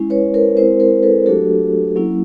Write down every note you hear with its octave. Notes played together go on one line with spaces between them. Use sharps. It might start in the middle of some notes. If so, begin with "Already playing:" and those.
Already playing: G#3 C#4 E4
B4 C#5
A#4 C5
G#3 C4 E4 A#4 C5
A#4 C5
A4 B4
F#3 A3 D4 F#4 G4 A4
F#3 A#3 C#4 E4